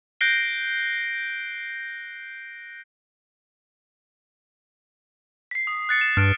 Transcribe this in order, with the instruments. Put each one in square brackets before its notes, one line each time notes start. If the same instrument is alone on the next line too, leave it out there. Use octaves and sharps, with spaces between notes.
[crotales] F#6 G6 A#6 C7 D7 G7
B6 C7
D#6
F#6 A6 C#7
E7
[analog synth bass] G2 [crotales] F6 F#6 D7